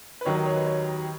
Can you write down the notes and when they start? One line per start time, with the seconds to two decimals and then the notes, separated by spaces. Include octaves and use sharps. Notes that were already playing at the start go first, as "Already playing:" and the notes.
0.21 B4
0.25 D#2 D#3 F#3 C#5
0.35 D#5
0.46 C#5
0.56 B4
0.66 C#5